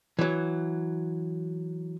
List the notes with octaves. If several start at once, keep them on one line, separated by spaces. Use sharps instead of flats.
E3 F#3